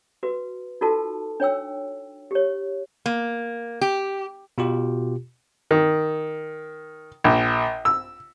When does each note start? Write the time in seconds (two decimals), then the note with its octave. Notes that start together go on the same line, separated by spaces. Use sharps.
0.23 F#4 B4
0.81 D#4 F4 F#4 A4 A#4 A5
1.40 D4 C#5 G5 E6
2.31 G4 C#5
3.06 A#3
3.81 G4
4.58 B2 F4 G4
5.71 D#3
7.24 A#1
7.85 E6